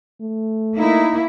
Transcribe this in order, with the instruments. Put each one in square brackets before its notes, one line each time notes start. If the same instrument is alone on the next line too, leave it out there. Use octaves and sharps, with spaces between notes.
[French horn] A3
[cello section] A#3 E4 [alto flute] D#4